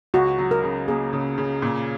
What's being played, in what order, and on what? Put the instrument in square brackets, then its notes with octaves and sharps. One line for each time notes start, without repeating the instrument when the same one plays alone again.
[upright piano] C#2 [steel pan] F#4
[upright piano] F#3
[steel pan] A#4
[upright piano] C#3
[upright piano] A#3 [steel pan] G#4
[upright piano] C#3
C#3
A#2